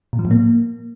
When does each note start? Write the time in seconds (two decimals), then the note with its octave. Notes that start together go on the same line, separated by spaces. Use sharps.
0.13 A#2
0.19 F3
0.25 A2
0.31 A#3